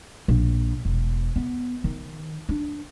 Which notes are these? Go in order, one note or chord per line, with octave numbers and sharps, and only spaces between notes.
A#1
E1
B3
D#3
D4